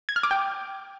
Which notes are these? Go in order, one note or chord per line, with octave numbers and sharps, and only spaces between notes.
G#6
F6
D6
G5